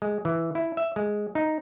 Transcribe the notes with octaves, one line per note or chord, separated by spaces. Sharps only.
G#3
E3
E4
E5
G#3
D#4